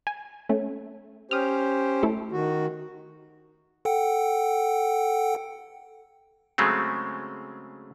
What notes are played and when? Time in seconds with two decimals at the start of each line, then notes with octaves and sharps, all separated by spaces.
0.07 G#5
0.49 A3 C#4
1.31 C#4 G4 C5 D#6 F6
2.03 A3 E4 A4
2.32 D#3 F#4
3.85 A4 F#5 G5
6.58 C#3 F#3 G#3 A3 C4